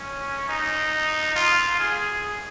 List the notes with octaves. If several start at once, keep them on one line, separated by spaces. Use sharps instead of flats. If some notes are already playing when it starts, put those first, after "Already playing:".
Already playing: C#4
D#4
F4
G#4